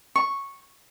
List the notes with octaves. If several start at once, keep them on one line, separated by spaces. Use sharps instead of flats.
C#6